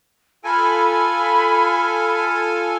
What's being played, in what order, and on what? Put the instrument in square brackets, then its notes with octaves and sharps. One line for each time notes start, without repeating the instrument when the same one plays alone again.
[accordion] F4 A4 G#5 [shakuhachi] B5